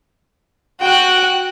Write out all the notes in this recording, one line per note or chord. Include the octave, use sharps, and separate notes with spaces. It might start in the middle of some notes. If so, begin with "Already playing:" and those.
F#4 G5 F#6